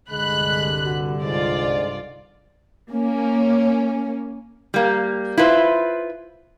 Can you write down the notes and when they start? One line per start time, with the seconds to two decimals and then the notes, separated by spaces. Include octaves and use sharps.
0.10 C2 G2 D3 G#3 B5 F#6
0.85 F#4
1.23 G#2 F4 D5
2.90 A#3 C#4
4.74 G3 A#3
5.38 E4 F4 B4 C5